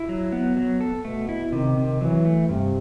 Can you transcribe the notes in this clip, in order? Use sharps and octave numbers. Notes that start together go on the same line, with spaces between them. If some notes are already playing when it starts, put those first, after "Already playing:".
Already playing: E4
F#3
B3
F#3
A4
B2 A3
E4
C3 D#3
C3
E3 F#3
A3
G2 C3